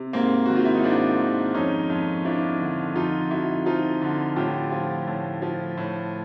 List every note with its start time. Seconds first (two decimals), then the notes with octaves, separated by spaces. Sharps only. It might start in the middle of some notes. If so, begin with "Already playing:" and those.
Already playing: C3
0.13 G#2 A#3 C4
0.46 D#3 F#4
0.55 F4
0.65 E4
0.75 D#4
0.84 G#2 C4 D4
1.19 D#3
1.54 F2 C#4 D#4
1.90 F2
2.25 F3 D4 E4
2.60 D3
2.96 F2 D#4 F4
3.30 F2 E4 F#4
3.66 F3 D#4 F4
4.02 D3
4.36 A2 F4 G4
4.72 F3
5.07 A2
5.42 F3
5.77 A2